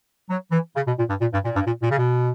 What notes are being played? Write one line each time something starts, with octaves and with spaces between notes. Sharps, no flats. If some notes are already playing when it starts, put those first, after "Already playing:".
F#3
E3
C#3
B2
A#2
G2
A#2
G2
A#2
G2
A#2
A#2
C#3
B2